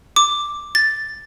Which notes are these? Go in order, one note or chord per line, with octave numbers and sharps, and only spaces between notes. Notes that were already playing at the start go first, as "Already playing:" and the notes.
D6
A6